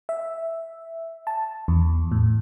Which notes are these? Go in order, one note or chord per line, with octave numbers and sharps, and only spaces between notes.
E5
A5
E2
A2